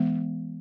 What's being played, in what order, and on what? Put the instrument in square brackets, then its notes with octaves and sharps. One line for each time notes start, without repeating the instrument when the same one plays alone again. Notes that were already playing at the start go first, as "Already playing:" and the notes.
Already playing: [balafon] E3 G#3 B3